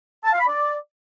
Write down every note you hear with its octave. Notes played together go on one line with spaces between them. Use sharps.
A5
F5
B5
D5